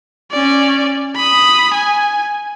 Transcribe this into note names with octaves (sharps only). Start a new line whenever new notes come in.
C#4 D5
B5 D#6
G#5